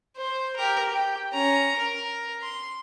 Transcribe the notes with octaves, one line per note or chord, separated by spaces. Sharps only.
C5
G4 A#4
G4 G5
C#4 A#5
A#4
C6